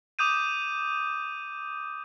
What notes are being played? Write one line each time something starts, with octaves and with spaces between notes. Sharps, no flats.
D6 D#6 G6 D#7